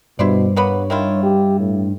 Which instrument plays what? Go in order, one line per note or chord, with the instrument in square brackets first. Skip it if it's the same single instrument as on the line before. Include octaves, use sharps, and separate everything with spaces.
[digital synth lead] G2 [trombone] B2 [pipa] E4 C5 D5
[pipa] A#3 B3 B5 [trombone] C#5
[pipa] D#3 E4 F4
[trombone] G4
A2